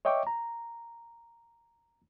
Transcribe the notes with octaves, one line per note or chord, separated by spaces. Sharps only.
C#5 D#5 E5 G5 C#6 D6
A#5